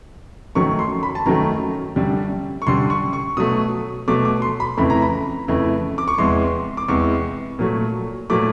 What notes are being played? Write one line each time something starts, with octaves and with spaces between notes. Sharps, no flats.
F#2 D#3 F#3 A3 C#6
C6
B5
A5
F#2 D#3 F#3 A3 A#5
F#2 D3 G3
C#6
F#2 D3 G3 C6
C#6
C#6
B2 F#3 A3 D#6
B2 F#3 A3 D6
D6
C6
B5
F2 C#3 E3 A3 B5
A#5
B5
F2 C#3 E3 A3
D6
C#6
E2 C3 E3 G#3 C6
D6
E2 C3 E3 G#3 C#6
A#2 F#3 A3
A#2 F#3 A3 D6